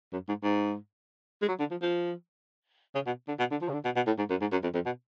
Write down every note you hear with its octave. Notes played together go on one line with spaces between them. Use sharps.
F#2
G#2
G#2
G#3
F#3
D3
F3
F3
C#3
B2
D3
B2
D3
F3
C#3
D3
B2
B2
A2
G#2
F#2
G#2
F#2
F2
F2
B2